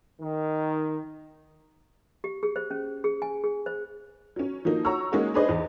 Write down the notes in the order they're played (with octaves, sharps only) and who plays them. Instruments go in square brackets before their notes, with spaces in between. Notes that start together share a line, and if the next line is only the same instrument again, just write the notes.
[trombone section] D#3
[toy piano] G4
G#4
C5
C#4
G#4
G#5
G#4
C5
[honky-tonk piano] F#3 C#4
F3 F#3 A#3 D#4
F#4 C#5 A#5 C#6 E6
F#3 G#3 A#3 C#4 D#4 F#4
D4 D#4 G#4 B4 C5 D#5
E2